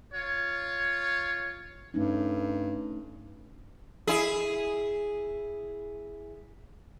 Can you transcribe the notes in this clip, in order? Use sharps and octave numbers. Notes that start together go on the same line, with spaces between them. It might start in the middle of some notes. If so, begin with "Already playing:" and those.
F4 C#5
G2 A3 C#4 D#4
E4 G#4